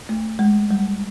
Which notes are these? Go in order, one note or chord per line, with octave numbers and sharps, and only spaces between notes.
A3
G#3
G3